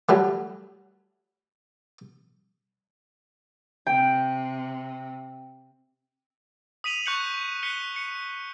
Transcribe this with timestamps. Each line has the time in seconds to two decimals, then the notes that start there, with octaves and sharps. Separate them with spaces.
0.09 F#3 G3 A3
3.87 C3 G5
6.84 D#6 B6 D#7 F7 F#7
7.06 C#6 F#6 G6 C#7 F#7
7.63 F#6 B6 C#7 G7
7.96 C#7